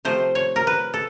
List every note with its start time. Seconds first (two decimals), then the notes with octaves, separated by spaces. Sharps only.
0.05 C3 F3 A3 C5
0.35 C#5
0.56 A#4
0.67 B4
0.94 A4